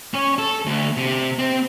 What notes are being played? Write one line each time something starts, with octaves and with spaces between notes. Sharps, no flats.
C#4
A4
D2
C3
C4